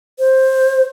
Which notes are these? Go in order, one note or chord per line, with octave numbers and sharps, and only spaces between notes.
C5